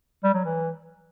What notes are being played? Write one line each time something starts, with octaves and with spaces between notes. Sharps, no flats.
G3
F#3
E3